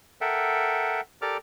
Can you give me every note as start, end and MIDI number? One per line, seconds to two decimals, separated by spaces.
0.21 1.01 69
0.21 1.01 70
0.21 1.01 76
0.21 1.01 78
0.21 1.01 79
1.22 1.37 67
1.22 1.37 69
1.22 1.37 70
1.22 1.37 74
1.22 1.37 86
1.22 1.37 89